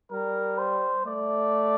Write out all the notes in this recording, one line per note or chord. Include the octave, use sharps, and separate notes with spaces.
G3 A#4
C5
A3 D5